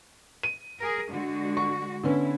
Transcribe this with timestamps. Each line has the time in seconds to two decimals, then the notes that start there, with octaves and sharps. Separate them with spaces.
0.43 D#7
0.80 G#4 A#4
1.09 D3 G#3 F#4
1.57 C#6
2.03 D3 B3 C#4 E4